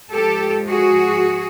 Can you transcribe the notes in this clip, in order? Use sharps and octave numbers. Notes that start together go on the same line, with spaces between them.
G#2 F3 G4 A4
F#4 G#4